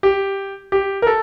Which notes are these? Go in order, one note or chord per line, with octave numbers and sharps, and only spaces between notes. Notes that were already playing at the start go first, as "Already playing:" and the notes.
G4
G4
A#4
A4